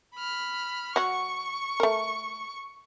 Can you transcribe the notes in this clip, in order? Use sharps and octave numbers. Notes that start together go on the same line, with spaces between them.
B5 F6
F#3 F#4 C#6
A3 A#4